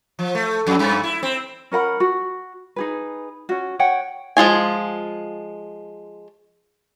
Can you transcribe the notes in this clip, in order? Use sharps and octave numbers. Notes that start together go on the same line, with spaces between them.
F3
A3
F2
G2
E4
C4
C#4 A#4 F#5 B5
F#4
D#4 G#4 B4
C#4 F#4
C#5 F#5 G5
F3 G#3 F4 G#5